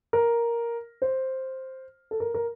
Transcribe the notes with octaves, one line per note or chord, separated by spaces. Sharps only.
A#4
C5
A4
A#4
A#4